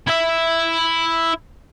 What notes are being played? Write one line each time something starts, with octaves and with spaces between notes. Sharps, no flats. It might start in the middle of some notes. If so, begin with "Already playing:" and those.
E4 E5